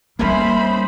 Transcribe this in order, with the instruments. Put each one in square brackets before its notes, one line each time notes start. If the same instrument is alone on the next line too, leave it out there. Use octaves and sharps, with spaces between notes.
[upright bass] G3 C4 [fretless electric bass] A#3 [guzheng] C#4 E4 [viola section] D#4 C5 B5